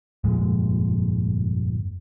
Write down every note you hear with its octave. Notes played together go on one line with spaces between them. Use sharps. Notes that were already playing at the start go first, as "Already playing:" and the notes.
G1 F2 A#2 G#3